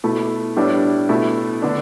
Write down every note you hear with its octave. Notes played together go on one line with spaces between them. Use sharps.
B2 A3 E4
A2 G3 B3 D4
B2 A3 E4
D3 B3 D4